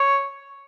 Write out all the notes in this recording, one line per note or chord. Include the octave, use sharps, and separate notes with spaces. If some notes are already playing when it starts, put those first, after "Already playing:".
Already playing: C#5